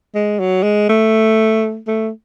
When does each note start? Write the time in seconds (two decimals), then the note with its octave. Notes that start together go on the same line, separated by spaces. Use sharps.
0.15 G#3
0.40 F#3
0.63 G#3
0.90 A3
1.88 A3